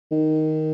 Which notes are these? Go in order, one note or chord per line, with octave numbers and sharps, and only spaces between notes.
D#3